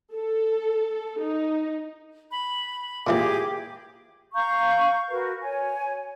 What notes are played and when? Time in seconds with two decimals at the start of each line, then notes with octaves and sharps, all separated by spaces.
0.15 A4
1.21 D#4
2.31 B5
3.07 A#2 E3 A#3 G4 G#4 D6
4.34 F5 A#5 C#6 G6
5.10 F#4 A#4 B4
5.42 C#5 G#5